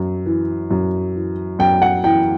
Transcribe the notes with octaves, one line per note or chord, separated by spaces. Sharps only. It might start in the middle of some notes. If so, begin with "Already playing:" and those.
Already playing: F#2
E3
F#2
E3
F#2 G5
F#5
E3 G5